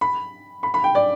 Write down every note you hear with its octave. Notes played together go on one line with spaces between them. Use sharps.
B5
B5
B5
G5
D5